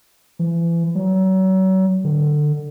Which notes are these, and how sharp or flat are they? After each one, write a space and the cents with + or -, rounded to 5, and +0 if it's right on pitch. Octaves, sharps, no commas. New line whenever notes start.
E3 +35
F#3 +35
D3 +20